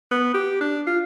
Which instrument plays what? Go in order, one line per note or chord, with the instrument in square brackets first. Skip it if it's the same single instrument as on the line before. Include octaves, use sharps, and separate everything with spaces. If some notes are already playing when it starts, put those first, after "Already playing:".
[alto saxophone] B3
G4
D4
F4